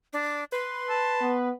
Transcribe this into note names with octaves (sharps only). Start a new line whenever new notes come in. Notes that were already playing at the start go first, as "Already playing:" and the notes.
D4
B4 C6
A5
B3